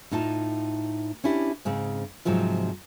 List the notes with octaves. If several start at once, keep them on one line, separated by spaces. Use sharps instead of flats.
A2 D#4 F4 A5
C#4 D4 E4 G4
G#2 C#3 C4
G#2 C3 F3 F#3 F4